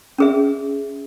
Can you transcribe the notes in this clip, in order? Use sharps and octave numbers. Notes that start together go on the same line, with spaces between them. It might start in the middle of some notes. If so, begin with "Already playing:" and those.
C#4 G#4 E5